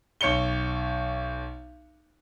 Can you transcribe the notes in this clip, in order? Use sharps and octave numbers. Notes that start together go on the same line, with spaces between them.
B1 C#5 C#7 G7